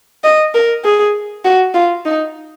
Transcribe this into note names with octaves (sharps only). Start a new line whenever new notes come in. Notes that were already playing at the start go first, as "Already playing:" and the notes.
D#5
A#4
G#4
F#4
F4
D#4